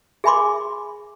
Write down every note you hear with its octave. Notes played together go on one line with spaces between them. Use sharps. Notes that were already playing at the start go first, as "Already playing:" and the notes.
G#4 E5 G#5 B5 C6 D6